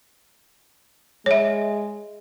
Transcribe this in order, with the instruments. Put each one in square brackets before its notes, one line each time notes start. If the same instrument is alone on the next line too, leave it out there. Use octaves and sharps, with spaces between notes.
[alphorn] G#3 [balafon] C#5 E5